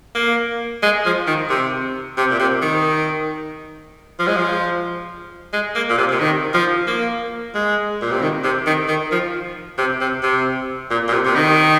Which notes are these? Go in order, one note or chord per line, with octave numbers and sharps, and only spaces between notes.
A#3
G#3
F3
D#3
C3
C3
A#2
C3
D#3
F3
G#3
F3
G#3
A#3
A#2
C3
C3
D#3
F3
A#3
G#3
A#2
C3
D#3
C3
D#3
D#3
F3
C3
C3
C3
A#2
A#2
C3
C3
D#3